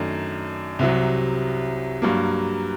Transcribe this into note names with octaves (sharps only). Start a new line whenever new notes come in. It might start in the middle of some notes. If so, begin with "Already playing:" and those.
Already playing: F#2 D#3 A3 D4
C2 C3 F#3
G2 F#3 A#3